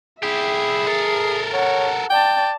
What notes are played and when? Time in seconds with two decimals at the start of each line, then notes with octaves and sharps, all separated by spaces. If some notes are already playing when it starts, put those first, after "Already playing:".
0.23 E4 G4 G#4 E5
0.87 A4 A#4
1.53 C#5 F#5
2.10 D5 G5 A5